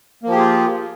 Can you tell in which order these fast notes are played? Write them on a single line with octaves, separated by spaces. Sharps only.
A#3 F3 G4 G#4 F4